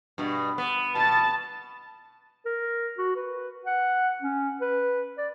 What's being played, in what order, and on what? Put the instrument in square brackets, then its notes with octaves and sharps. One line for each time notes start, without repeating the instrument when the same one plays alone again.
[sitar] G2 B2
B3
[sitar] B2 [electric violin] A5 A6
[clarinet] A#4
F#4
B4
F#5
C#4
B4
D5